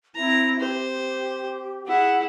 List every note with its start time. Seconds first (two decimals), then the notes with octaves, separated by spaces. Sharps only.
0.15 C4 E4 A#5
0.60 G4 C5
1.87 E4 G#4 F#5